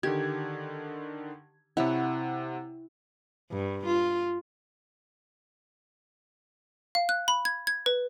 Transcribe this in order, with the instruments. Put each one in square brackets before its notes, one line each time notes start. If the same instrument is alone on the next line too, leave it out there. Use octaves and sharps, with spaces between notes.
[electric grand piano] D3 D#3 G#6 [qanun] G4
[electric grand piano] C3 F#5 [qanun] E4 C#5
[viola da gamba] G2
F4
[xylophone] F5
F#6
B5
G#6
G#6
B4